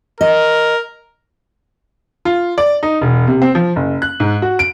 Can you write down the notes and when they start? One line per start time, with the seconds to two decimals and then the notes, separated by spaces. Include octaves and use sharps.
0.21 A#4 D#5
2.25 F4
2.58 D5
2.83 D#4
3.01 E1
3.27 C3
3.42 C4
3.55 F3
3.76 F#1
4.02 F#6
4.20 G#2
4.42 F#4
4.59 D7